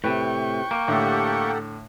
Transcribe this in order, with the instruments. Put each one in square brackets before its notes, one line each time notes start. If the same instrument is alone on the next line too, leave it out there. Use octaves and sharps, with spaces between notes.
[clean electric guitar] A2 C3 [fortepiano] B4 [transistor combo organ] G5 C#6
[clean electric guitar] A#3
[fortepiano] A2 D3 [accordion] G4 A4 F#5